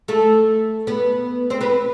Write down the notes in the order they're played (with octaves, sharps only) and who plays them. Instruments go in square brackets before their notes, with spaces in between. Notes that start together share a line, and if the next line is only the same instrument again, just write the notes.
[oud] A3 A4
B3 B4
C4 C5
B3 B4